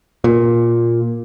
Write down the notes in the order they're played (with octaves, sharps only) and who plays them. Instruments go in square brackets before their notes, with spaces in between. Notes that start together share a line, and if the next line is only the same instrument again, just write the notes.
[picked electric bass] A#2